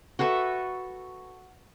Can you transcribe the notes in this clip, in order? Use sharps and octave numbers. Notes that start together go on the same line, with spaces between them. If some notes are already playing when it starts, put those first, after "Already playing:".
F#4 A4 B4 E5